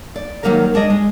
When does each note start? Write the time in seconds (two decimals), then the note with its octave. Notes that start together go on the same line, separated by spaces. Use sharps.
0.16 D5
0.43 D#3 F3 F#3 A#3 G4 A#4
0.74 G#3 D4 G#4 D#5
0.90 G#3